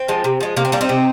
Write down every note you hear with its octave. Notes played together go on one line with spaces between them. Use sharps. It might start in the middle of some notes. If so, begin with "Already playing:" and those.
Already playing: C4
F3 G#3
C3
F3 G#3
C3 A#3
C4
G3 A#3 D4
C4 D#4
C3